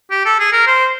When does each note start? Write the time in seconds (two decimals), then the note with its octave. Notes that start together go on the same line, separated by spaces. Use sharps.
0.11 G4
0.26 A4
0.40 G#4
0.52 A#4
0.67 C5